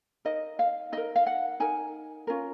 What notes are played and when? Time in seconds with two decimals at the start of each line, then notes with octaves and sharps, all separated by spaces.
0.25 D#4 A#4 D#5
0.59 F5
0.92 D#4 A#4 D#5
1.16 F5
1.26 F#5
1.60 D#4 A#4 G#5
2.27 C#4 F4 A#4